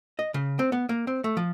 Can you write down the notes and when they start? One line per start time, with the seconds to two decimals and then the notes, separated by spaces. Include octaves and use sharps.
0.19 D#5
0.34 C#3
0.59 C4
0.72 B3
0.89 A#3
1.07 C4
1.24 A3
1.37 F3